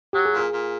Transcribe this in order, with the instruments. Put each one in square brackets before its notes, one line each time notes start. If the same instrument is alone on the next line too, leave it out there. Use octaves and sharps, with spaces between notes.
[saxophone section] F#3 [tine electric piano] G4
[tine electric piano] G#4
[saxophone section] A#2
[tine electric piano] G#4
[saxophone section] A#2